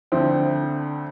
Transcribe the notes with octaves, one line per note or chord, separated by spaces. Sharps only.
D2 D3 F3 C4